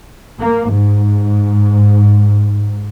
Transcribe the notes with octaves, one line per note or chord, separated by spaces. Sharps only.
A#3
G#2